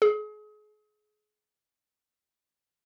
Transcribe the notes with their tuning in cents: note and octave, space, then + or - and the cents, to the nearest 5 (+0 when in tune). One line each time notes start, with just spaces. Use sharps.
G#4 +35